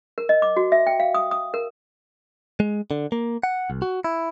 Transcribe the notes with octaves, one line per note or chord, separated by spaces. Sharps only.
A#4
D#5
D6
F#4
E5
G5
F5
D#6
D#6
A#4
G#3
D3
A#3
F#5
C2
F#4
E4